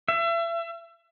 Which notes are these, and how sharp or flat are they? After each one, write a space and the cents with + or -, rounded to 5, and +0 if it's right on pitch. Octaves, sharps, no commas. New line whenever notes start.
E5 +35